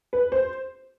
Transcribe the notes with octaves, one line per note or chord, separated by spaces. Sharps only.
B4
C5